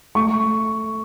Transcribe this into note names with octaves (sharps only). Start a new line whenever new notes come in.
A3 C#6